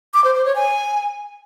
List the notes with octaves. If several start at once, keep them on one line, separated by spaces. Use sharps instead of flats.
D6
C5
C5
C#5
G#5